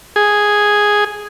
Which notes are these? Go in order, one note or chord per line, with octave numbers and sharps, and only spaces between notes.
G#4